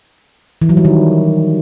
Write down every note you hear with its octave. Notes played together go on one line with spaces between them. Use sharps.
E3
F#3
G3
D#3